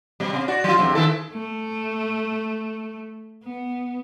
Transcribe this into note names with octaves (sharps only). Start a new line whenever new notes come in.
B2 G3
C3
F#4 D5
F#3 F4
E2 G2 C3
D#3 E4 A4
A3
B3